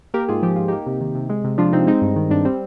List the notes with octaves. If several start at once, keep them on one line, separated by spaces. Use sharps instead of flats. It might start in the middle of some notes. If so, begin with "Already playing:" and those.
A#3 G4 A#4
G#2 F4 G#4
F3 G4
G#2 F4
A#3 D#4 G4
C3
D#3
C3
G#3
C3
F3 D4 F4
C3 C4 D#4
G#3 C4 D#4
G2
D#3
G2 D4
G3 C4